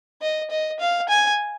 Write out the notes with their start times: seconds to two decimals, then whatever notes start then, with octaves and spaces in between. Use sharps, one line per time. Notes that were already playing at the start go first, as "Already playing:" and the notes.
0.22 D#5
0.51 D#5
0.80 F5
1.09 G#5